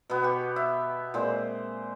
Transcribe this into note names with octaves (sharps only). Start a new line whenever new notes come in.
B2 B3
G4 C#6
E5
A#2 G#3 C4 C5